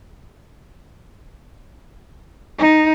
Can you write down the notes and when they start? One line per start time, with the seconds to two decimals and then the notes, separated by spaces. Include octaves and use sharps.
2.59 D#4